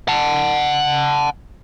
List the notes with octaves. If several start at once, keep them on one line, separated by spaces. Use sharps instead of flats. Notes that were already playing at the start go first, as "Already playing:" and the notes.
F#5 A5